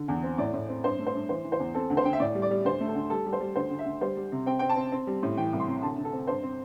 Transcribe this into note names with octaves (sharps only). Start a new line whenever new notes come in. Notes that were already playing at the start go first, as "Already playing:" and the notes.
Already playing: D3
E2
C4
A2 D5
A2
C4
G2 C5
A3
C5
G2
E3 C5
E3
C5
E2
C4 A4
D2
C5
D3 G5
E5
A2 D5
G3
D5
G3
D2 C5
A3
A4
D2
G3 A4
G3
C5
G3
D2 C5
D2
E5
D2
G3 C5
G3
C3
C4 G5
C4 G5
A5
C4
C4
G3
A2
E3 G5
C2
C6
C3
D2 A5
D3
A4
C4
G2 C5
C4